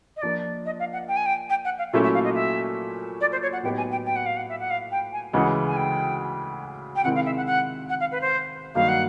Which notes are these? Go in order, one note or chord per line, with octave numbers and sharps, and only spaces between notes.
D#5
F3 A#3 D4 D5
D#5
F5
F#5
G5
G#5
G5
G5
F#5
F5
A#2 F#3 A3 C#4 E4 E5
E5
F5
D#5
E5
D5
C5
C#5
F#5
A2 F#3 B3 D#4 G4 G5
G#5
G5
G5
F#5
F5
F#5
E5
F#5
F5
G5
G#5
D2 C#3 E3 G#3 F#5
G#5
G5
G5
C3 D#3 G#3 C4 E4 F#5
F5
E5
F#5
F#5
F#5
F5
B4
C5
G2 D#3 F#3 A#3 F5
F#5